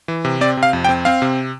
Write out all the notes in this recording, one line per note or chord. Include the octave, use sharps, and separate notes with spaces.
E3
C3
C4 D5
C3
F5
F2
G5
C4
C4 F5
C3